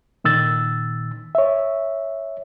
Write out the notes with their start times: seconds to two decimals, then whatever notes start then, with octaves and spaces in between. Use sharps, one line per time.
0.24 A#2 D#3 E6 A6
1.35 C#5 E5